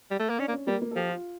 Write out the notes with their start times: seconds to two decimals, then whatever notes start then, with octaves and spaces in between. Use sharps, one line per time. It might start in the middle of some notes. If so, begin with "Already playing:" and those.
0.11 G3
0.19 A3
0.29 A#3
0.38 C#4 D4
0.48 A#3
0.53 C#4
0.67 G3 A#3
0.82 A#3
0.91 A4
0.96 F3 G4
1.09 F4